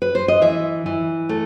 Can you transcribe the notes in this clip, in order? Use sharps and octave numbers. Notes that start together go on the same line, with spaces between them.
B4
C5
D#5
E3 E5
E3
A3